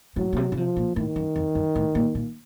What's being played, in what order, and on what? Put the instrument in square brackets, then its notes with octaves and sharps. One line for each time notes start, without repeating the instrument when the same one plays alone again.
[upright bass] A2 [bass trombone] F#3
[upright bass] A#2
C3
C#3
[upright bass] C3 [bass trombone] F3
[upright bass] A#2
[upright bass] A2 [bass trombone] D#3
[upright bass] F#2
F2
F#2
A2
A#2
A#2